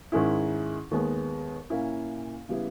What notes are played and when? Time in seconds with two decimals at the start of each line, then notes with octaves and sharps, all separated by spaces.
0.12 G#2 D#3 G#3 C#4 E4
0.91 D#2 D#3 G#3 B3
1.70 A#2 A#3 C#4 E4
2.49 C#3 G3 B3 E4